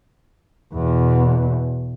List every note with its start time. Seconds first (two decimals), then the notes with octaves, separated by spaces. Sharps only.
0.74 E2 B2